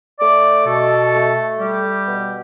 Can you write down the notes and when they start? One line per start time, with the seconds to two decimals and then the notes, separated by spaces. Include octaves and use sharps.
0.19 A3 D5
0.66 B2 A4
1.13 A3
1.59 G3 G4
2.06 B2